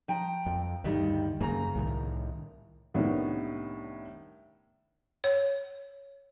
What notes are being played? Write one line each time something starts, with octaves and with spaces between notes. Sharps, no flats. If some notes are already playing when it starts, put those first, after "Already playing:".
F3 G5 A#5
F2
D2 G2 D#3 G3
F#2 C#3 G3 A#3 A#5
C2 A2 D#3
C2 A2 D#3 B3 C#4 D4
C#5